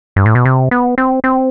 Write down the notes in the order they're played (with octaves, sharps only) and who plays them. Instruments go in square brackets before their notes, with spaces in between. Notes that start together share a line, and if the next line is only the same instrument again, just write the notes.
[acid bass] G2
A2
B2
C3
B3
C4
C4